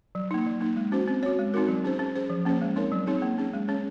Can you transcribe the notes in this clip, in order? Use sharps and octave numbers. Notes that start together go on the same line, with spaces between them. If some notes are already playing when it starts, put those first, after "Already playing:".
F#3
A#3 D#4
F#3
A#3 D#4
G#3
C#4 F#4 C5
C4
F#4 C#5
G#3
C4 D#4 F#4 A#4
F#3
C#4 G#4 C5
C#4
G#4 C5
F3
A#3 C#4 G#4 C5
G#3
C4 D#4 A#4 C#5
F#3
C4 D#4 G#4 C#5
A#3
C#4 G#4
G#3
C#4 G#4 C#5